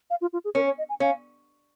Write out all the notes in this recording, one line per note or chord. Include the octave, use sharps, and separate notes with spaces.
F5
F4
F4
G#4
C#4 A#4
C#5
D#5
G#5
C#4 F5